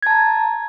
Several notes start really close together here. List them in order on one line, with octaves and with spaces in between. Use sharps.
G#6 A5 A#5